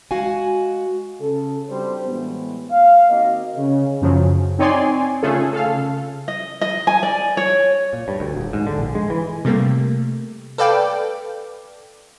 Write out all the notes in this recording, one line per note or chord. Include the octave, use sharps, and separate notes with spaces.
G#3 F#4 F5 G#5
C#3 A4
G3 C4 D4 F#4 C5
A2 E3 G3 G#3 B3
F5
D#3 A#3 C4 F#4 D#5
C#3
F#2 C#3 F3 F#3
C4 D#4 C#5 D5 G#5 C6
C#3 A3 C#4 F4 G#4 A4
A4 F5
C#3
D#5
D#5
G#5
D5
C#5
A#2
G2
D2
D#1
G#2
D3
A#1
G#3
E3
C3 G3 A3 A#3
A4 B4 D5 F5 G5 D6